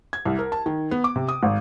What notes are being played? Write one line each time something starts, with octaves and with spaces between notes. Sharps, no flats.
G#6
C2
A#4
A5
D#3
B3
D6
C3
D#6
G#1